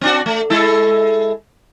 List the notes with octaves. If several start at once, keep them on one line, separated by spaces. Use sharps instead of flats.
C4 D4 F#4
A3
G#3 E4 A4